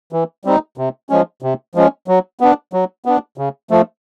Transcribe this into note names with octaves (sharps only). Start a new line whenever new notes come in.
E3
G3 C4 D#4
C3
F3 G#3 C#4
C3
F3 G#3 C#4
F#3
B3 D4
F#3
B3 D4
C#3
F3 A3